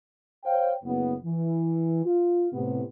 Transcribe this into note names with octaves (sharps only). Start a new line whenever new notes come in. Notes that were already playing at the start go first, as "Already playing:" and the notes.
C5 C#5 F5 G5
F#1 B3
E3
F4
A2 C3 B3